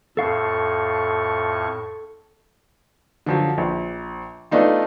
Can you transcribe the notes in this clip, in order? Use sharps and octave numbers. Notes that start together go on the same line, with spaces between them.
F2 A2 A4 F5 C#6
D3 F3 F#3
A#1
A3 B3 D4 D#4 F4